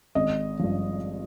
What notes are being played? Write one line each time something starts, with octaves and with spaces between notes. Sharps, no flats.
G#1 D#5
G2 F3